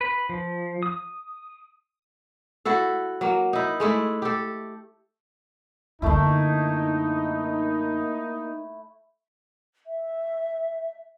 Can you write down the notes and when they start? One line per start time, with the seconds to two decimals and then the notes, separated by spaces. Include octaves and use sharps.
0.01 B4
0.29 F3
0.83 D#6
2.65 E4 F#4 A4
3.21 F#3 A#3
3.53 D#4 E4
3.80 G#3 A3 E4
4.22 G4 A4
6.02 F#2 D3 A3 A#3 D#4 E4
9.86 E5